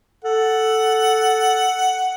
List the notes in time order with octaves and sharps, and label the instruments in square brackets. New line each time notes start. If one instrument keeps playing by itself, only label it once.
[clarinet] A4 [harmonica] F#5